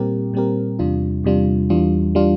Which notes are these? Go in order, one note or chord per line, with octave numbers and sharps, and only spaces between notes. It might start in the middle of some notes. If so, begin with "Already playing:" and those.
Already playing: A#2 G3 C4 G4 A#4
A#2 G3 C4 G4 A#4
E2 C3 G3 D4 F4
E2 C3 G3 D4 F4
E2 E3 G3 D4 F4
E3 G3 D4 F4